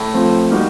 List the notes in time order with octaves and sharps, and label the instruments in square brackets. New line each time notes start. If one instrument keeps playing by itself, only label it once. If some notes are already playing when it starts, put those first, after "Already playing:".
Already playing: [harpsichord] A2
[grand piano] F3 A3 C4
G3 A#3 D#4 F#4